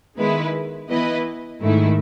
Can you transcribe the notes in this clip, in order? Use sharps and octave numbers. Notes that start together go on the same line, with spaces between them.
D#3 G#3 B3 E4 B4
E3 B3 E4 B4 D#5
G#2 D#3 A3 E4